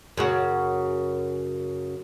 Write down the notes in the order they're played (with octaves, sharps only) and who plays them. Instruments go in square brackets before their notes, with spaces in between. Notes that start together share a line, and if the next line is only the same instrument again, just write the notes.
[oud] F#2 C#3 F#4